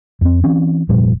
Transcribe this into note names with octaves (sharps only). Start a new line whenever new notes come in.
F2 C4
E3 C4 C#4
F1 A#2 F3 G3